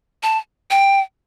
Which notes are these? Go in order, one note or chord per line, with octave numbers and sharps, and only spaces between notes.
A5
G5